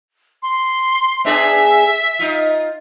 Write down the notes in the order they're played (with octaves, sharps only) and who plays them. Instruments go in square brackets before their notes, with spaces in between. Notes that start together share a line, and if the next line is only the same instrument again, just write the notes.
[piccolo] C6
[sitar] B3 D4 G#4 [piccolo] E5
[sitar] D#4 F4